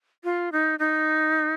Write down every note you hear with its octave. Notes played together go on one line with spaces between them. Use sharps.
F4
D#4
D#4